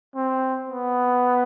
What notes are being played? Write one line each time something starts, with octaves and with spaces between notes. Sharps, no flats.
C4
B3